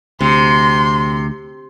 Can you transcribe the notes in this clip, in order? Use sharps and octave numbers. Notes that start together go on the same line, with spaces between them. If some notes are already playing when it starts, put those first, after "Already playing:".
D2 C3 C6